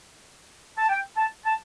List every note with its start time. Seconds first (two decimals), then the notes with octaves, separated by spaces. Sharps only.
0.78 A5
0.89 G5
1.16 A5
1.44 A5